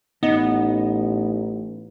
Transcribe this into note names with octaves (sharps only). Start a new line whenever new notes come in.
A1 B3 D#4 D#5